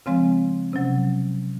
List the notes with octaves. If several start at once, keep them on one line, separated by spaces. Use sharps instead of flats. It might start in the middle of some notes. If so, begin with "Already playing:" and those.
C#3 F3 G#3 C4
C3 F#3 C#4